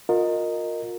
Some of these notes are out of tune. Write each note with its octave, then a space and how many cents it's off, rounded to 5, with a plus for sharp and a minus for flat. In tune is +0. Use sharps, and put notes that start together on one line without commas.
F4 +35 A#4 -10 D#5 -5